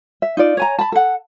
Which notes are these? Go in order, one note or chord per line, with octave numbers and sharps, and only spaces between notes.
E5
D#4 F4 D5
C#5 G#5 A#5
A5 B5
A4 F#5